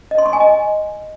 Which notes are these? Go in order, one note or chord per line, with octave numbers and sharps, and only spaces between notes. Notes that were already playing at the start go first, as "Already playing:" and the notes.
D#5
C6
C#6
G#5
D#5